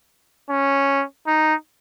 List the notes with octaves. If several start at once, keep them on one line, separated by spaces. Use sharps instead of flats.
C#4
D#4